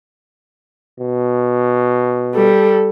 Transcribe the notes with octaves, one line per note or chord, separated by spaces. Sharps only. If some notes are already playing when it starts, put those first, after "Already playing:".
B2
G3 A4